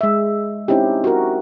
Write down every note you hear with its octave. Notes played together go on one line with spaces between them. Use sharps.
G#3 E5
C4 C#4 D#4 E4 G4
F#4 A#4